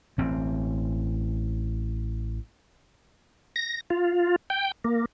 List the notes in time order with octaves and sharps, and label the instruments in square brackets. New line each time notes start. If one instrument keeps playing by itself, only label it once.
[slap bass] A1 C4
[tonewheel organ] A#6
F4
G5
A#3